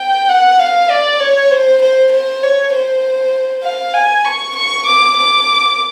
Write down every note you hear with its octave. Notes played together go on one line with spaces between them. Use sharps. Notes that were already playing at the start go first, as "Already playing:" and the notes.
Already playing: G5
F#5
F5
D5
C#5
C5
C5
C5
C#5
C5
F5
G#5
C#6
C#6
D6
D6